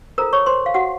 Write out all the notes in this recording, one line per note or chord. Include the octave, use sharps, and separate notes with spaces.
F4 A4 A#4 C5 A#5
C#5 C#6
C5 C6
F5
F#4 F#5